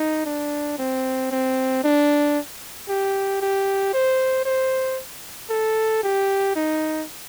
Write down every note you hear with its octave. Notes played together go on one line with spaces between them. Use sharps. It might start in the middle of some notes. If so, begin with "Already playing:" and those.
Already playing: D#4
D4
C4
C4
D4
G4
G4
C5
C5
A4
G4
D#4